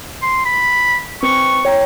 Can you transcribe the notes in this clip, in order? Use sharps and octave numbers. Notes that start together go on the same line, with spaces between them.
C6
B5
C4 B4 C#6
C#5 G5 A#5